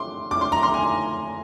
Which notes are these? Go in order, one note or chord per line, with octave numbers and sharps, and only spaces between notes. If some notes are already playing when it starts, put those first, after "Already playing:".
Already playing: C6 D6
D6
C6
A#5
C6
G#5